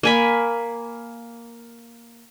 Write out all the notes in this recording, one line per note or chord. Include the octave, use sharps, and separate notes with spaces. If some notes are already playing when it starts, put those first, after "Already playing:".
A#3 G#5 B5